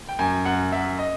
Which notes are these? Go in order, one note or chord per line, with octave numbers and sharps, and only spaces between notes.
G5
F#2 G#5
F#2 F#5
F#2 E5
D#5